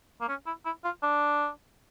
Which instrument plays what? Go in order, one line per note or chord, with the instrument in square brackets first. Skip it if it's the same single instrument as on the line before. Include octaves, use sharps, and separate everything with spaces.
[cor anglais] A#3
C#4
E4
E4
F4
D4